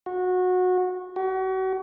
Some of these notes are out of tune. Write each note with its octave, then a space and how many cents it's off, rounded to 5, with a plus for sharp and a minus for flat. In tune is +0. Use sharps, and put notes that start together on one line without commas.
F#4 -20
F#4 +35